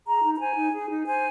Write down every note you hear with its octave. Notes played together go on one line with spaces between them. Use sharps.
G#4 A#5
D#4
A#5
C5 G#5
D#4
G#4
D#4
C5 G#5